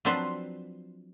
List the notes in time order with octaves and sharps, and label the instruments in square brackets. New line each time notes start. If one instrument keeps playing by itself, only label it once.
[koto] F3 F#3 C4 D4 B4 C5